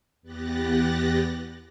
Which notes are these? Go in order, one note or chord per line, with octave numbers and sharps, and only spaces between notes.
E2 B3 G4 F#6 A6 A#6